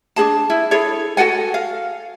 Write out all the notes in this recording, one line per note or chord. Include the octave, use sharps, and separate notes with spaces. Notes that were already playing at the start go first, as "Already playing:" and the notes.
D4 D#4 G#4 A5
E4
E4 G#4 A4 C#5
F#4 A4 F#5 G#5
F5